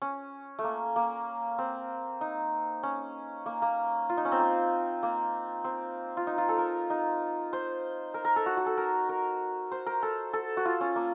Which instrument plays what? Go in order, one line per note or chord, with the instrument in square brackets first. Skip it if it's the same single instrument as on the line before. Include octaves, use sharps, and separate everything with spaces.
[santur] C#4
A3
A#3
A#3
C4
D#4
C#4
A#3
A#3
F4
D#4
C#4
C4
A#3
A#3
C4
F4
D#4
F4
A4
A#4
D#4
C5
A#4
A#4
A4
F#4
F#4
A4
A#4
A#4
C5
A#4
A4
A4
F#4
F4
C#4
A#3